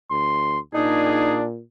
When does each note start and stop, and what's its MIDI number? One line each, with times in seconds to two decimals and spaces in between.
0.11 0.58 38
0.11 0.59 84
0.74 1.61 46
0.74 1.46 62
0.74 1.35 63
0.74 1.35 68